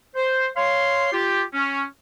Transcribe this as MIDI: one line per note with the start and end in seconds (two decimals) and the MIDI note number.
0.16 0.47 72
0.57 1.12 73
0.57 1.12 77
0.57 1.12 84
1.13 1.43 65
1.13 1.43 67
1.54 1.83 61